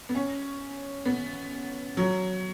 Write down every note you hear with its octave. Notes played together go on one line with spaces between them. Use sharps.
B3
C#4
B3
F#3